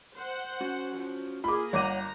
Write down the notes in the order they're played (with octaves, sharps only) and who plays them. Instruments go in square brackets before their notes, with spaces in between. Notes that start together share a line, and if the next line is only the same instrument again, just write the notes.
[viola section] C5 F#5
[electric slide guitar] C#4 F#4
[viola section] F3
[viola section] A#3 G#4 [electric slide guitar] F4 [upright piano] B5 D6
[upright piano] G1 D6 D#7 [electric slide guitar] C#5 D#5 F#5 [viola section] A#5